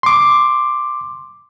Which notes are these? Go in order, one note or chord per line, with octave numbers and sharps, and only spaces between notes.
C6 D6